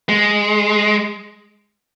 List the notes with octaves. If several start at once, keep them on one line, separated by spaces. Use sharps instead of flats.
G#3